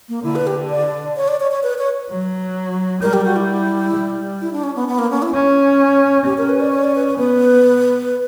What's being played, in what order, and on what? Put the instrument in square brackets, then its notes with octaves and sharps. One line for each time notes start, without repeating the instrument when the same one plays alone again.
[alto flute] A#3
[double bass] D3 [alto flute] E4
[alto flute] B4
G4
D5
C#5
D5
C#5
C#5
B4
C#5
[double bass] F#3
[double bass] G3 [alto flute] A#4
[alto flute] G4
F#4
E4
[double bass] G3
[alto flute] E4
D4
C#4
B3
B3
A#3
C#4
E4
[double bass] C#4
[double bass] C#4 [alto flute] G4
[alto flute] A#4
B4
D5
C#5
D5
B4
B4
[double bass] B3 [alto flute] B4